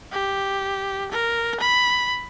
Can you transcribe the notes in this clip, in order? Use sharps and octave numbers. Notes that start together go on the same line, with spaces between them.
G4
A#4
B5